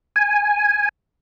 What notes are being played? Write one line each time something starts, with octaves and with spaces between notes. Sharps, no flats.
G#5